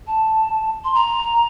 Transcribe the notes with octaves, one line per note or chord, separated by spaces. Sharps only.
A5
C6
A#5